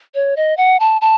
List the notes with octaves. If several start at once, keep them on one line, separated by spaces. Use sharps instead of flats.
C#5
D#5
F#5
A5
A5